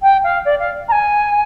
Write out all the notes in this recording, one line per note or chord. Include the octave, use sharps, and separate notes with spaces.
G5
F5
D5
F5
A#5
G#5